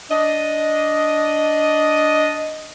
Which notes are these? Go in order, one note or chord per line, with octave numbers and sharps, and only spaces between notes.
D4 D#5